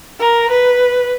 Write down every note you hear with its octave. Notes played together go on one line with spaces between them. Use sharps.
A#4
B4